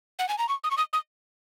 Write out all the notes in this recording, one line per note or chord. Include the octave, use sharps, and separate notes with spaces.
F#5
G#5
A#5
C#6
D#6
C#6
D#6
D#6